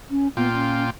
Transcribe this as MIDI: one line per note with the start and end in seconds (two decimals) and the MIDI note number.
0.11 0.28 61
0.37 0.90 46
0.37 0.52 59
0.37 0.90 65
0.37 0.90 79
0.54 0.84 61